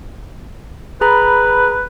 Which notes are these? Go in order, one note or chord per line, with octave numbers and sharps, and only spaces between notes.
G#4 B4 A#5 B5